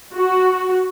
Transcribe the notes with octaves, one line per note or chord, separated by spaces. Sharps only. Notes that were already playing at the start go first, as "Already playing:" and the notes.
F#4